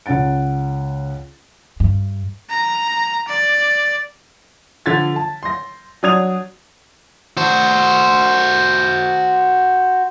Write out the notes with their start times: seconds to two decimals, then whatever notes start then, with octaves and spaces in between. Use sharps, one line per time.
0.06 C#2 C#4 F#5 A6 D7
1.80 G2
2.50 A#5
3.28 D5
4.86 D3 F3 G#6 A6 B6
5.16 A5
5.43 C6 A#6
6.03 F#3 D4 D#6 G#6 F7
7.37 F#4 C5